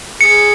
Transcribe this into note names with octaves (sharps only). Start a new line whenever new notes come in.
G#4 C#7